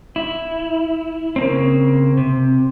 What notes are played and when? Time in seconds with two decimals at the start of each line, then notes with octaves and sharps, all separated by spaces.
0.16 E4
1.36 C#3 A#3 C4
2.17 C3